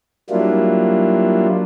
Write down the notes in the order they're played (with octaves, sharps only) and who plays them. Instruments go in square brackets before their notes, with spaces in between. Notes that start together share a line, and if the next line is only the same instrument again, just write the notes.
[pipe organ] F#3 G3 A#3 D4 E4 F4